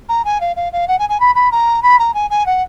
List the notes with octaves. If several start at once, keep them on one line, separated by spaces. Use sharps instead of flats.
A#5
G#5
F5
F5
F5
F#5
G#5
G#5
B5
B5
A#5
B5
A#5
G#5
G#5
F#5